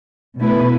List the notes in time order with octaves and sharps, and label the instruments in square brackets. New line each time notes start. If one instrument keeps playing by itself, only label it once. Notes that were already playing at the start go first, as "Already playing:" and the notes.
[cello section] B2 A3 E4 B4